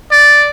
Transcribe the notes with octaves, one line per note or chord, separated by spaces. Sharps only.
D5